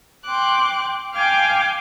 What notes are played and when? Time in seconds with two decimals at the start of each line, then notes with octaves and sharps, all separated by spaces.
0.25 G5 C6 D6 F#6
1.15 F5 G5 G#5 D6 F6